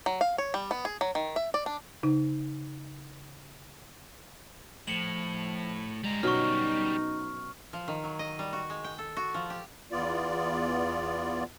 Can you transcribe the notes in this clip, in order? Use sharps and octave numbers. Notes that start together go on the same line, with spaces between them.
F#3
F5
C#5
G3
B3
G#4
F#3
D#3
E5
D5
D4
C#3 D#4
A2 F3 C#7 F#7
G3 G#3 A#5
B2 F#3 C#4 D#4 C#6 F6
F3
D#3
F#3
D#5
G3
F#4
G#3
G5
A4
F#4
F3
G4
E2 B3 F4 D5